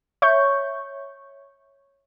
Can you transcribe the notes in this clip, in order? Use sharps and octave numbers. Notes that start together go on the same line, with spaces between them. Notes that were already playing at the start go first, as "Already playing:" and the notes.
C#5 E5 C#6 G6